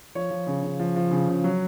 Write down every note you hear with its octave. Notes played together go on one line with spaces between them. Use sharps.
F3 C#5
F3
C#3
C#3
F3
F3
C#3
C#3
F#3